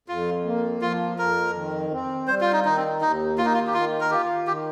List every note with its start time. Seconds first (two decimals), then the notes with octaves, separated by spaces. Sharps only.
0.08 F2 F4
0.45 A#3
0.81 F3 F4
1.18 F2 A#4
1.54 D#3
1.91 C4
2.28 G3 C5
2.41 F4
2.53 D#4
2.64 D#3 D#4
2.77 C4
3.01 D#2 D#4
3.37 A#3 F4
3.45 D#4
3.54 F4
3.67 G4
3.74 D#3 F4
4.00 A#4
4.10 F4 G4
4.47 D#3 G4